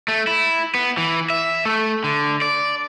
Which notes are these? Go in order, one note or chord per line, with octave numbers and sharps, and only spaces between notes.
A3
E4
B3
E3
E5
A3
D3
D5